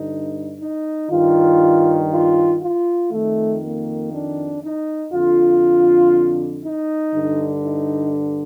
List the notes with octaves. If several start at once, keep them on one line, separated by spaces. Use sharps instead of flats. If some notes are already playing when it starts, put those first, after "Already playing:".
Already playing: G2 D3 D#4
D#4
G2 D#3 F4
F4
F4
F2 D#3 A3
A#3
D4
D#4
F2 D3 F4
D#4
G2 D3
D#4